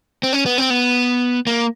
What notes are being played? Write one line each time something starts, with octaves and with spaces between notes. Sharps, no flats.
C4
C#4
B3
C4
B3
A#3